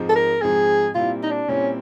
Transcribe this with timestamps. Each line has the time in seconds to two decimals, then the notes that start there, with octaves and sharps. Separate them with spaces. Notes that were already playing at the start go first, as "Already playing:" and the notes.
Already playing: G#2 F3 G#3 C4
0.09 A4
0.16 A#4
0.42 G#2 F3 G#3 C4 G#4
0.95 A#2 G3 C4 E4 F4
1.23 D#4
1.31 D4
1.48 A#2 G3 C4 C#4 E4